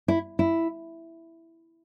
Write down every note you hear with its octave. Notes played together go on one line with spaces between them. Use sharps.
E4
E4